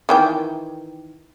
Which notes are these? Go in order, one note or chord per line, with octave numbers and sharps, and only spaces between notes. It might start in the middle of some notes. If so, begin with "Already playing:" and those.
D#3 E3 G5